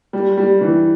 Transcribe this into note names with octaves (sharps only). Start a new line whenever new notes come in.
G3
G3
E3